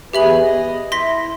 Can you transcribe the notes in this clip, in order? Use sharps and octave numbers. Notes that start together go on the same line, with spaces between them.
E2 G4 G#4 B4 E5 F#7
D#5
E4 C6 A#6 B6